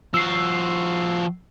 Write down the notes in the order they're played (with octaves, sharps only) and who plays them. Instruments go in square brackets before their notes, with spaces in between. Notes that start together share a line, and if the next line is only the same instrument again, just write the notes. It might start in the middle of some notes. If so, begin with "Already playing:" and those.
[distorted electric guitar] F3 F#4 [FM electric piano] E6 C7